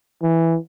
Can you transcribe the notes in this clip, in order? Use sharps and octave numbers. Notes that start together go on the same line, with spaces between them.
E3